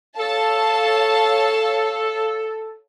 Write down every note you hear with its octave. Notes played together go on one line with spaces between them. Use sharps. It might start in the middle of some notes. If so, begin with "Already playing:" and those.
A4 C#5 F5 A5